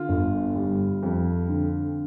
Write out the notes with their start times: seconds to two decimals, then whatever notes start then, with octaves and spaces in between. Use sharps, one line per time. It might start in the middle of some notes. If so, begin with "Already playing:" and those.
Already playing: D3 F4
0.09 G1
0.55 G3
1.03 F2
1.49 D3